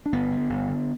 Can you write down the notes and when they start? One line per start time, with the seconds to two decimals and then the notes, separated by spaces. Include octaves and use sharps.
0.06 D4
0.12 G1 B3
0.31 D3
0.50 G1
0.69 D3